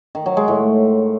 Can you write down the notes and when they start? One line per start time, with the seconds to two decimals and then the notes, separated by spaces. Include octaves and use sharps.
0.15 D#3
0.26 F#3
0.37 G#3
0.48 A2